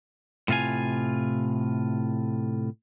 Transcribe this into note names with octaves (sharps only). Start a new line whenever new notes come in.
A2 C3 F4 F5 G#5